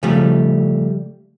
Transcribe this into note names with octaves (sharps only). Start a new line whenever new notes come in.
C#3 F3 G3 A3